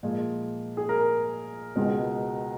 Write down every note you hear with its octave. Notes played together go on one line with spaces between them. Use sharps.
A#2 F3 G#3
G#4
A#4
C#2 B2 G#3